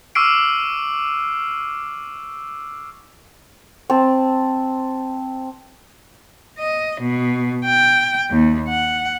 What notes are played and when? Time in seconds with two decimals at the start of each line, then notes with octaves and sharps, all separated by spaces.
0.15 C#6 D6 E6 F6 C7 D7
3.90 C4 A5
6.59 D#5
7.01 B2
7.65 G5
8.31 D#2
8.69 F#5